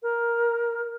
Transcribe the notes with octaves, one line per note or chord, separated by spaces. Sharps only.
A#4